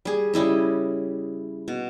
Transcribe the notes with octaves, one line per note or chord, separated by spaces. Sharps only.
G3 G#4
C#3 G3 E4 D#5
B2